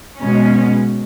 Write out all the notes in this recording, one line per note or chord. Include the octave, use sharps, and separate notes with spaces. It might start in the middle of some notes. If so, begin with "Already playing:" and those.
B2 G#3 C#4